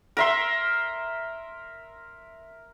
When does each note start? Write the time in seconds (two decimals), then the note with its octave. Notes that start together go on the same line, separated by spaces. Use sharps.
0.17 A#4 E5 C6